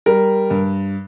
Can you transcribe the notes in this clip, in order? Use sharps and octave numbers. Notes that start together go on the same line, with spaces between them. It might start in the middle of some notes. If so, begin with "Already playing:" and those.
G3 A#4
G2